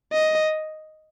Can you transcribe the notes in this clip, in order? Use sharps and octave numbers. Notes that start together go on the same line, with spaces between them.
D#5